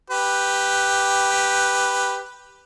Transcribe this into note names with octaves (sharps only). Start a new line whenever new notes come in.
G4 B4